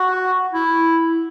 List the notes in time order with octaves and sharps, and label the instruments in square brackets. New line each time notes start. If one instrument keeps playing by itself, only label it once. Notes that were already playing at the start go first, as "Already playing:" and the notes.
Already playing: [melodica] F#4
[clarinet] E4